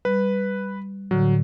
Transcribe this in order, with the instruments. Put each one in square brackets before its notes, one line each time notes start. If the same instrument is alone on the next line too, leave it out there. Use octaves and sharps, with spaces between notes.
[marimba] G3 [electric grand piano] B4
[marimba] A2 D3 [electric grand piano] F#3